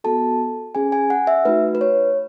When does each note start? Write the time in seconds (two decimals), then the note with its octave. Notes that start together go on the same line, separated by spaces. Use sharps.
0.04 B3 F#4 A4 A5
0.75 C#4 G#4 G#5
0.92 G#5
1.10 F#5
1.27 E5
1.45 A3 D#4 F#4 B4
1.75 B4
1.81 C#5